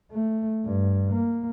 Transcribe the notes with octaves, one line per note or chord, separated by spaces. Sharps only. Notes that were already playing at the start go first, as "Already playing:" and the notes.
A3
G2
A#3